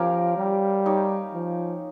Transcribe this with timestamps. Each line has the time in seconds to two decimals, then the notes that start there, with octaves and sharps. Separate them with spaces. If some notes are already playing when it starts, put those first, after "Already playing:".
Already playing: F3 A#3 C#4 G4 A#4 F5
0.37 G3
0.86 D#4 G4 C#5
1.34 F3